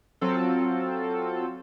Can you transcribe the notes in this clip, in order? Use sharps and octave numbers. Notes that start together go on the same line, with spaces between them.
F#3 C4 F4 A4